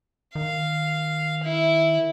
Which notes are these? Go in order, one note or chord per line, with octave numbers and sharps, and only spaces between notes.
D#3 F5
E4